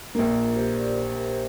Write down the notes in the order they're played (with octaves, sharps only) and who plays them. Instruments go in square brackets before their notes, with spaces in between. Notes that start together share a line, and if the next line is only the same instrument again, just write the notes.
[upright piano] A#1 A#2 A#3 [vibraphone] F4 A#4
[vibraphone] G4 C5
A#4 D5
G4 C5
A#4
C5